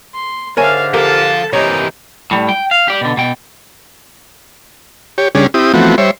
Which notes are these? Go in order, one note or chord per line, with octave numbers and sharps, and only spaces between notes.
C6
G#2 D3 D4 A#4 C#5 E5 F5 G#5
F3 G4 A4 A#4 F5 A5
C3 D#3 E3 G4 C5 C#5 D#5 A#5
A2 G3
G5
F5
G4 D5
B2 D3
B2 G5
G4 C#5
C#3 G3 C#4 D4 G#4
C4 E4 G4 D#6
E3 F3 A3 B3 C4 F#4
G3 C5 C#5 E5